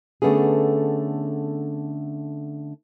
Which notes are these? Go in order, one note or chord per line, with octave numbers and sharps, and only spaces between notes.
D3 A3 B3 C#4 G#4